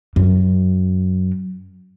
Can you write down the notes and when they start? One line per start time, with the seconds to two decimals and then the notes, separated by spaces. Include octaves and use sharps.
0.16 F#2